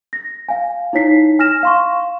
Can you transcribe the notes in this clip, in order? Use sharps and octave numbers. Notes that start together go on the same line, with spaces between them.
A#6
F5 G#5
D#4 E4 C#5 B6 C7
G#5 F6 A#6 E7
F5 C6 C#6